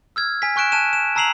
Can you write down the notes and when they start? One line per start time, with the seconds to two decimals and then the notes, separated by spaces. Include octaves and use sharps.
0.16 E6 F6 G#6
0.42 G#5 B6
0.56 G#5 C#6 F#6 D7 E7
0.72 A5 F#6 D#7 E7
0.93 E7
1.16 A5 A#5 E6 C7 F7 F#7